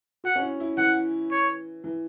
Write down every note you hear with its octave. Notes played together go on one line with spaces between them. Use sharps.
F#4 F#5
C#4
E4
E4
E3 F#5
C#5
E3